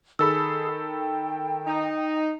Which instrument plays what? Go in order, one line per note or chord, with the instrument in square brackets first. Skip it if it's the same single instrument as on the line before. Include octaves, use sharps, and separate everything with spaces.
[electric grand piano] D#3 A4 B5 [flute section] G#4 [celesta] E6
[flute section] G5
[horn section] D#4